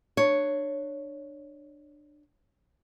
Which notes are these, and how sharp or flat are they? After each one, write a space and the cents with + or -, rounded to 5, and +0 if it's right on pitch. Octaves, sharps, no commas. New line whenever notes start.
D4 +25 C#5 +0